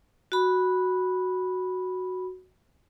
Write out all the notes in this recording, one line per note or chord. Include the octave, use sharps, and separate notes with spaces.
F#4 B5